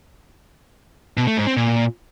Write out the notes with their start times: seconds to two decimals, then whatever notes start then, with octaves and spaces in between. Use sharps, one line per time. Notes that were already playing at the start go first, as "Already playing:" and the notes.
1.17 B2
1.27 A3
1.37 G#2
1.47 C4
1.57 A#2